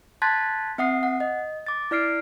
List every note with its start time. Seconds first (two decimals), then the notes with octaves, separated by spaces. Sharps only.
0.22 A5 C6 F#6 G#6 A6 B6
0.78 C4 E5 F#5 D#6 C7
1.03 F#5
1.20 D#5
1.67 D6 A6
1.91 E4 D5 F6 C7 D7